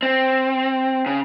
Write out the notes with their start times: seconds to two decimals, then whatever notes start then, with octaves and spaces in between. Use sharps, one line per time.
0.03 C4
1.06 C#3